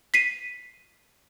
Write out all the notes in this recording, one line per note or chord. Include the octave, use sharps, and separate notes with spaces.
B6 C7 D#7